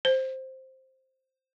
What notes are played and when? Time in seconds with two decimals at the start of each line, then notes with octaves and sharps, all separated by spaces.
0.05 C5